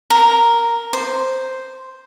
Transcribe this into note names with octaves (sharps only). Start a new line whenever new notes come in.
A#4
C5